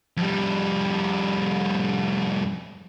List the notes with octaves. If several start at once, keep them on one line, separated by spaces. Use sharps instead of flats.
F2 G3